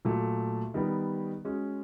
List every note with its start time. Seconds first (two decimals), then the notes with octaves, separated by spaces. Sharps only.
0.05 A#2 F#3 A3
0.74 D#3 G3 B3
1.45 G#3 C#4 F#4